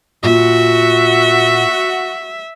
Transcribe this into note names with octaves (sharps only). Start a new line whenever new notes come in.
A#2 F#4 E5